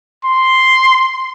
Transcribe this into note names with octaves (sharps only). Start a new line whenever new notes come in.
C6